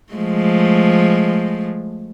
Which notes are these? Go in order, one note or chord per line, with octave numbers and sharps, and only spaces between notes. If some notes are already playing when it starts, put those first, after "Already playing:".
F3 G#3 A3